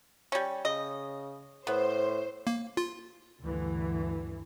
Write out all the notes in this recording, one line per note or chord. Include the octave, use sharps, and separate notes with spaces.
G3 C#4
C#3 D#5
A2 B3 C5
A#3
F4
D2 G2 D3 E3